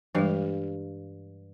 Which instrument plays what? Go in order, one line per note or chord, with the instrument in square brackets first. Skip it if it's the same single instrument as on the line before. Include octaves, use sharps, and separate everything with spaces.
[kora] G2 F5 [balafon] E3 G3 G#3